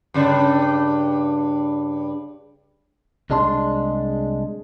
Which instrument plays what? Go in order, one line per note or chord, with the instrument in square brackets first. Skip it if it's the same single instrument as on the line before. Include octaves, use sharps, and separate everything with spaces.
[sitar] G2 C#3 D4
[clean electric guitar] C2 G#3 D4 A5 C6